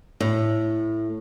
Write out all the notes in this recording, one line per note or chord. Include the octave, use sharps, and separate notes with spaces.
A2